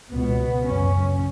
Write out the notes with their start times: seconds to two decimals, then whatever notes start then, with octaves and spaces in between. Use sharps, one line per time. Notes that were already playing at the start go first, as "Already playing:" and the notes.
0.12 C#2 B2 B3
0.66 F#2 C#3 C#4